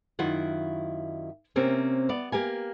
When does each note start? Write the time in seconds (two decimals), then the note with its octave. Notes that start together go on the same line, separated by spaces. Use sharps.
0.19 F#2 D#3 E4 F4 F#5
1.56 C3 A#3 C4 C#4
2.09 B3 D5
2.32 A#3 G4 A#4 G#5